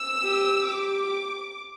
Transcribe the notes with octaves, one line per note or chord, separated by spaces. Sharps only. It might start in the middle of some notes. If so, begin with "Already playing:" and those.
Already playing: E6
G4
G4 D6